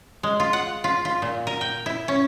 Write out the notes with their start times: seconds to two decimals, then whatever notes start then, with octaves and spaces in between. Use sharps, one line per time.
0.23 G#3
0.40 F4
0.53 F#5
0.84 F4
1.05 F4
1.22 A#2
1.47 A#4
1.61 G5
1.86 E4
2.08 C#4